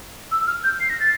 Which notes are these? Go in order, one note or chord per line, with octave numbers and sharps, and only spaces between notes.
E6
F6
G6
C7
A#6
A6